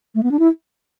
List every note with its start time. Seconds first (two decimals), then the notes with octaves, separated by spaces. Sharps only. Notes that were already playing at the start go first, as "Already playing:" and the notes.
0.15 A3
0.23 B3
0.31 D4
0.39 E4